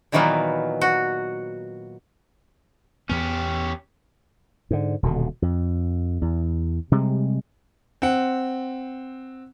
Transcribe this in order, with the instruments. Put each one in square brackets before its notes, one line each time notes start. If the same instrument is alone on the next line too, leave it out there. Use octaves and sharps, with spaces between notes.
[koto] A#2 D#3 E3 F#3 A#3 B3
F#4
[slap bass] E2 B3 [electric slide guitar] C#4 G4
[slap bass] G#2 D3
D#1 B2 D3
F2
E2
C3 G3 G#3
[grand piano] C4 F#5